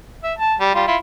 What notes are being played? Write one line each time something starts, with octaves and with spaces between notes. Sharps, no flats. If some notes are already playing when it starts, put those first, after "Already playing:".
E5
A5
G3
G3 F4
E4 F4